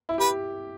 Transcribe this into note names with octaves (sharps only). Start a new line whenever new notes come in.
E4
G4 B4